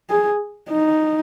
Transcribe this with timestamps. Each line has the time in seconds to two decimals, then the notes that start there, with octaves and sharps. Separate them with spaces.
0.10 G#4
0.70 D#4